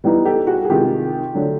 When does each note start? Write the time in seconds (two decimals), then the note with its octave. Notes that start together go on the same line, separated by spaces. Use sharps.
0.04 E3 G3 B3 D#4
0.25 G4 A4
0.47 F#4 G#4
0.65 G#4
0.69 C3 D#3 G#3 F4 G4
1.34 D3 F#3 A3 D4